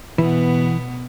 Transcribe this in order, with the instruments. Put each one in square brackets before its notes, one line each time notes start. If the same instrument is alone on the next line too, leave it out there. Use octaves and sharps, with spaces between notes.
[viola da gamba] B2 B3 [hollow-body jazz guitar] E3